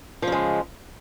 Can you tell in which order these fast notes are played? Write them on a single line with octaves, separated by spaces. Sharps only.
F3 C#3 G#3